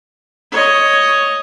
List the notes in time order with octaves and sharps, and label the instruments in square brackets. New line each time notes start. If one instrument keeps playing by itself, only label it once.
[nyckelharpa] C#5 D#5